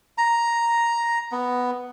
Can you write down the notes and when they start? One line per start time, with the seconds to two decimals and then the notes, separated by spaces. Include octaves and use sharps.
0.18 A#5
1.32 B3